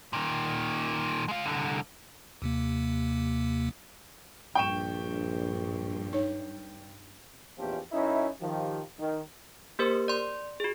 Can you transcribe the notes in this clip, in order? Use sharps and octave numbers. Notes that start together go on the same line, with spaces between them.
A#2 D#3
G#3 F5
C2 D3
D#2 C3 A#3
A#1 G2 G5 C#6 E7
D#4 C#5
A#1 E2 A#2 F3 C#4 G4
F#2 C#4 D#4 E4
D#3 F3 G4
D#3
A#3 G4 A#4 C5
D5 C6
F#4 G#4